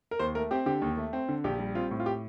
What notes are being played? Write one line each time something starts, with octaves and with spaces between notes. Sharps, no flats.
A#4
D#2 C5
A3 A#4
C4 G4
D3 G4
D#2
A3
C4
D3
A#1 G4
G3
C4 F4
A2
F4
G4